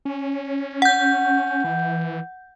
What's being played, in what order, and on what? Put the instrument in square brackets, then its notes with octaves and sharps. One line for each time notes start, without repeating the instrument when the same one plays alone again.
[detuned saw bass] C#4
[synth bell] F#5 G6
[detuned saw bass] E3